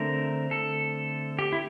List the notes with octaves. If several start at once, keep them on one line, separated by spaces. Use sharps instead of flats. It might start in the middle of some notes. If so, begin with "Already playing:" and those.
Already playing: D3 A3 C4 A#4
A4
G4
E4